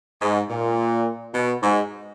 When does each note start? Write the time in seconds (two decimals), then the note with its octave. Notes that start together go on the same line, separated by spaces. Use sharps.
0.21 G#2
0.49 A#2
1.34 B2
1.62 G#2